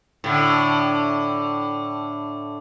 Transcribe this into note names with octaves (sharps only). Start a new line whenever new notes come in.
A2 D3